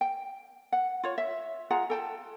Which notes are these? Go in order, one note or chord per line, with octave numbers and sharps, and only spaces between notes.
G5
F#5
F4 C#5
E5
F4 G#4 F#5 A#5
A4 G5 A5